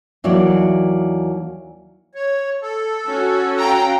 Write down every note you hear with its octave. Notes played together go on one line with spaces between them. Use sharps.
D#2 E3 F#3 A#3 D5
C#5
A4
C#4 F#4
F5 G5 A#5